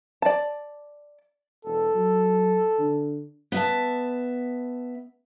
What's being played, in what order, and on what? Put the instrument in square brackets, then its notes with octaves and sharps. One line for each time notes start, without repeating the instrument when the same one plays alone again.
[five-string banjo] D5 A5
[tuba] E1 [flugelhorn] A4
[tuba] F#3
D3
[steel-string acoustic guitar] B3 E5 A5